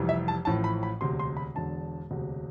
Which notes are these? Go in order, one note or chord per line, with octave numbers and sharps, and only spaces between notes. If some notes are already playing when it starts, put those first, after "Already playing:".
Already playing: F1 F2 E3 G3
E5
A5
A1 A2 F3 A5
B5
B5
E1 D2 C3 C6
C6
B5
E1 E2 D3 A5
E1 D2 C3